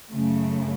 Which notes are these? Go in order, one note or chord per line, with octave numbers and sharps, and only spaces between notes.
F#2 C#3 A3